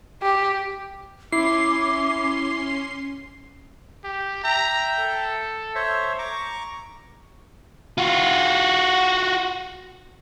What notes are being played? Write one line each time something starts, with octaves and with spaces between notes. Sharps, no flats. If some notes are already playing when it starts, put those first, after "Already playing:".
G4
C#4 E4 C6 D6 C7
G4
E5 G5 A#5
A4
C5 C#5 E5
A#5 C#6 D6
F4 F#4